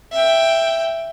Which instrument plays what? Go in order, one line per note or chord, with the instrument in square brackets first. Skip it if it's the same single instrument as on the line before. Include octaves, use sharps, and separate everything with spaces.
[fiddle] E5 G5